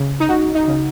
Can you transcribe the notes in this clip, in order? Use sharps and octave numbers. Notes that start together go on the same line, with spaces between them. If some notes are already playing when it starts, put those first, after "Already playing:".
Already playing: C#3
D#4
C#2 F#4
D#4
C#3